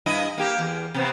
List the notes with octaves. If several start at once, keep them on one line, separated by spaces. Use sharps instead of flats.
G2 E4 D#5
A#3 G4
E2
C3 B3 C4